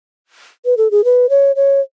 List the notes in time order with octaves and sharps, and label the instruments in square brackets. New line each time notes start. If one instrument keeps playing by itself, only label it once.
[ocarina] B4
A4
G#4
B4
C#5
C#5